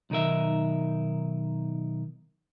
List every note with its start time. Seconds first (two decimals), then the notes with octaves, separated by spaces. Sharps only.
0.10 B1 D#3 D#4 A#4 E5